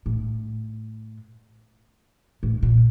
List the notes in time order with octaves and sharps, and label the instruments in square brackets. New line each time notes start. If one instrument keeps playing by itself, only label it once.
[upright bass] A2
A2
A#2